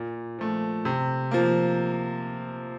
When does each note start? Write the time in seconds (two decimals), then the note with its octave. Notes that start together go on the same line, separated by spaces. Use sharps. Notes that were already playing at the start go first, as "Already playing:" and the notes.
Already playing: A#2
0.39 F3 A3
0.85 C3
1.31 F3 A#3